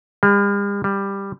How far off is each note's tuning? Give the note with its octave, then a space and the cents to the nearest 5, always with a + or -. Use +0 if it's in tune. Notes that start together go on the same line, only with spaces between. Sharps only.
G3 +45
G3 +10